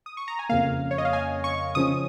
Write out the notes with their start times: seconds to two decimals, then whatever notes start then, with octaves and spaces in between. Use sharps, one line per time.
0.06 D#6
0.17 C#6
0.28 A#5
0.39 G#5
0.49 F2 C#3 A#3 F5
0.91 C#5
0.98 D#5
1.05 F5
1.13 G#5
1.44 C#6
1.75 C#3 F3 C#4 D#6